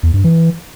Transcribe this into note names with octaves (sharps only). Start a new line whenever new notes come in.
E2
G2
E3